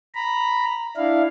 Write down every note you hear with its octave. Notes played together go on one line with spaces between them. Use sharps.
A#5 B5
D4 E4 F5